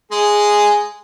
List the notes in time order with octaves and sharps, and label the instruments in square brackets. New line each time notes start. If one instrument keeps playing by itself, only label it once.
[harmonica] G#3 G#4